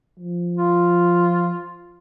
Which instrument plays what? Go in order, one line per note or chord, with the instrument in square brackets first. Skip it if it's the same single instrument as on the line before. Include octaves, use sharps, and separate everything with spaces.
[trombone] F3
[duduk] F4